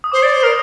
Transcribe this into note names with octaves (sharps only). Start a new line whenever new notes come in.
D#6
C5 D6
D5
C5
A#4